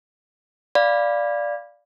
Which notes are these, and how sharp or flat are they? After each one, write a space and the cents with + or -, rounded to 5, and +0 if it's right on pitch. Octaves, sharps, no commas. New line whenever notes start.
D5 +0 F5 +0 B5 +0